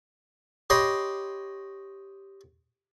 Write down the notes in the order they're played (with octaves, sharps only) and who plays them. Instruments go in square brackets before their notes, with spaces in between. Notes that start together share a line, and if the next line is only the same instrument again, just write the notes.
[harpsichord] G4 C#5 D#5 B5 C6